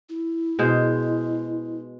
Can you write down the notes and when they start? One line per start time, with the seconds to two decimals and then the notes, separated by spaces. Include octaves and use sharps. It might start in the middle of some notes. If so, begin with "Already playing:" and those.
0.09 E4
0.59 B2 G#3 C5